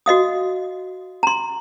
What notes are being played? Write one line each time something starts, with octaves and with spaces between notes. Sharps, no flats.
F#4 D#5 F5 D#6
A#5 C6